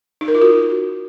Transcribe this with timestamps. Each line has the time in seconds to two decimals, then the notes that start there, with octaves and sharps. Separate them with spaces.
0.21 D#4
0.28 A#4
0.35 F4
0.42 F#4